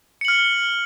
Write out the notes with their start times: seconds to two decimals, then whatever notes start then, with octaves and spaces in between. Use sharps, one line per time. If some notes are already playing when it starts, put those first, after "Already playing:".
0.21 C#7
0.25 F#7
0.28 F6